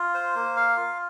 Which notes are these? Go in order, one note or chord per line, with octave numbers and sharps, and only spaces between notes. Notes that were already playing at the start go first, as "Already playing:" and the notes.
Already playing: F4
C5
A#3
F5
F4